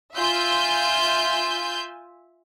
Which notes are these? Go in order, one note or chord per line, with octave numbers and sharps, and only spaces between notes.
F4 E5 G#5 G6